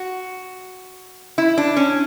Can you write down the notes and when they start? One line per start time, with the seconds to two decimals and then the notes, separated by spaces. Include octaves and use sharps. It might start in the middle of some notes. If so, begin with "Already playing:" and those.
Already playing: F#4
1.38 E4
1.58 D4
1.77 C#4